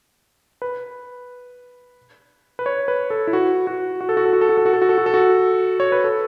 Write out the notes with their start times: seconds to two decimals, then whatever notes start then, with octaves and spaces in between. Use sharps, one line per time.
0.62 B4
2.59 B4
2.66 C#5
2.88 B4
3.10 A4
3.27 E4
3.33 F#4
3.67 F#4
4.01 F#4
4.09 A4
4.17 F#4
4.25 A4
4.33 F#4
4.41 A4
4.49 F#4
4.57 A4
4.66 F#4
4.74 A4
4.82 F#4
4.89 A4
4.98 F#4
5.06 A4
5.14 F#4
5.80 C#5
5.92 B4
6.04 A4